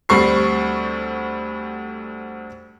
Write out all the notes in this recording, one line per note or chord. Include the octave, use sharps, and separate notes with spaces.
D2 G3 C4 C#6 C7